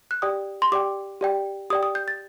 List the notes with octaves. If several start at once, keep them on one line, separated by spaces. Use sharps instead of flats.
F#6
G4 D5 G5 D#6
C6
G4 D5 G5 D6
G4 D5 G5
G4 D5 G5 D#6
D#6
G6
A6